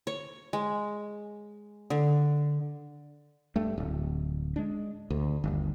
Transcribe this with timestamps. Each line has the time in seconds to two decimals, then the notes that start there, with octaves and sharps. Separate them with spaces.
0.07 C#5
0.53 G#3
1.90 D3
3.56 G2 A3
3.78 D1
4.56 G#3 D4
5.10 D2
5.44 G1 D#2